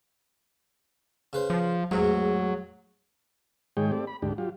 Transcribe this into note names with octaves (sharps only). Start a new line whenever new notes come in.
C#3 B4 C5
F3
A1 E2 G#2 F#3
G#2 D#3 G#3 G#4 C#5 G5
A3 C4 G4 D5
B5
D2 G#2 D4 G4
F#3 F4 G4